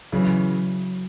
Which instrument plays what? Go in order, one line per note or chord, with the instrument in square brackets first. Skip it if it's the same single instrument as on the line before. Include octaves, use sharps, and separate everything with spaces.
[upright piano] C#3 E3 [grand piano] F#3